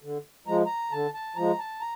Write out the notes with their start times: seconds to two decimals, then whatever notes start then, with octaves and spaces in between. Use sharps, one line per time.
0.02 D3
0.47 F3 G#3 A#5
0.66 A#5
0.91 D3 A5
1.14 A5
1.36 F3 G#3 A#5
1.59 A5
1.80 A#5